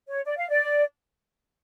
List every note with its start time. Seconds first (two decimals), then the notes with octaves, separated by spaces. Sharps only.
0.08 C#5
0.25 D5
0.37 F5
0.49 D5